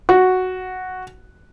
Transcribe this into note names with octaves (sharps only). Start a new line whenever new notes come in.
F#4